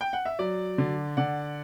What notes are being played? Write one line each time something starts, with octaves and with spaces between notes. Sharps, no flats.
G5
F#5
E5
F#3 D5
D3
D3 D5 F#5